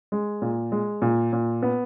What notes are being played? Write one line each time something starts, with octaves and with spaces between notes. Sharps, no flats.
G#3
A#2
G#3
A#2
A#2
B3